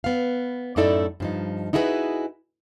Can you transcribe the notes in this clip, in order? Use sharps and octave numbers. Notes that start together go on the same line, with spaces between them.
B3 F5
F#2 A2 D#4 E4 A4 D5
G2 F3 D#4
D#4 E4 F#4 G#4 A4 B4